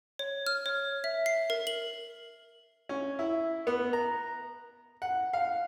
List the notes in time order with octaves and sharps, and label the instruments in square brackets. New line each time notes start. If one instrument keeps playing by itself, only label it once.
[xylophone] C#5
F6
C#5
E5
C7
A#4
F#7
[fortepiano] C#4
E4
B3
A#5
F#5
F5